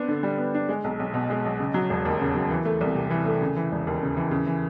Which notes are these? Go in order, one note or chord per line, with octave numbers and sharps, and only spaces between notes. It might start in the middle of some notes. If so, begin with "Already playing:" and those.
Already playing: B3 C4 D4
D3
G3
B3
D4
G#3
B1
B1
B2
G#3
B1
C#3
F#3
E1
D#2
C#3
F#3
E3
A3
C2
C3
E3
A3
C#3
E3
E1
D#2
C#3
E3
C#3
E3